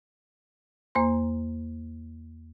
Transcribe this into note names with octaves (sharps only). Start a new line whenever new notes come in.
E2 A#3 C5 A#5 C6